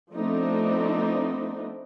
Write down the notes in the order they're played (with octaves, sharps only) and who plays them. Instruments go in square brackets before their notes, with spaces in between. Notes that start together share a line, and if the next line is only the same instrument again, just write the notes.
[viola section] F3 A3 B3 C4 D4 D#4